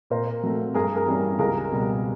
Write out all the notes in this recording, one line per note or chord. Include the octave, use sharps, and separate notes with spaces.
A#2 A#4 C5
F#3 A3
G2 G#4 A#4
G#4 A#4
E3 G3 A#3 C#4
C#2 G#4 A#4
B2 G3